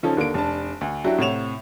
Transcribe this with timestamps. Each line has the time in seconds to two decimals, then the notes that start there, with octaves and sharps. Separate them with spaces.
0.03 C#3 F3 C#4 D#4 F4 A4
0.17 D#2 D3 A#3 D7
0.34 F1 D4 A5
0.81 D2
1.04 F#3 D4 E4 F#4 G4
1.18 A2 C3 C#5 F#5 E7 F7